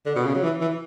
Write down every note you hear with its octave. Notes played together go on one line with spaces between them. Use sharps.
D3
B2
C#3
F#3
E3
E3